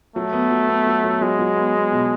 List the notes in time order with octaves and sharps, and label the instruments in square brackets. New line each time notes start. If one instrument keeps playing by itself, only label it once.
[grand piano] F#3 [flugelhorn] A3
[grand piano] B3
F#3
B3
F#3
F#3
[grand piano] F#3 [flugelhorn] G#3
[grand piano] F#3
B3
B3
B2